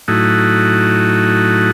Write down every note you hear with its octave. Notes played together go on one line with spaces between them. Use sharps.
A2 F#3 A3 D#4 E4 F#4